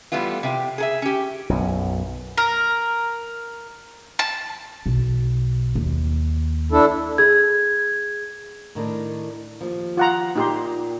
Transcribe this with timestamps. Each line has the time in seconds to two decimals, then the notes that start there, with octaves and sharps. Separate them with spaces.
0.12 E3 G3 A3 B3 F4
0.43 C3 G4
0.78 G#4 A4 E5
1.02 C#4 G4
1.49 B1 F#2
2.38 A#4
4.19 A5
4.86 B1
5.75 D#2
6.72 D4 E4 A4
7.18 G#4 G#6
8.75 A2 D#3 D4
9.61 D#2 F3
9.97 F4 F#5 A#5
10.36 A#2 D#4 G4 C6